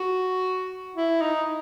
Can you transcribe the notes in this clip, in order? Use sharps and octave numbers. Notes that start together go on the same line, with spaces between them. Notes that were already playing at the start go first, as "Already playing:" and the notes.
Already playing: F#4
E4
D#4